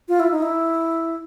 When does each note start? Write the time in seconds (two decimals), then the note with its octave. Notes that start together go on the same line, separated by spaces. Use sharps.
0.09 F4
0.20 E4
0.32 D#4
0.42 E4